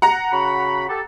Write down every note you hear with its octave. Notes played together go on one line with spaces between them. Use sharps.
F#5 A#5 A#6
C#3 F#4 B5
G4 A4